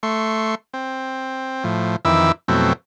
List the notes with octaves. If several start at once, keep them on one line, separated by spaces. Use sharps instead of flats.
A3 C6 C#6
C4
A2 F3
F2 D#3 E3 E4 D6 E6
F2 B2 F#3 A3 C4 E4